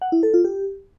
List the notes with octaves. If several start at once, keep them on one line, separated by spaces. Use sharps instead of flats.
F#5
E4
A4
F4
G4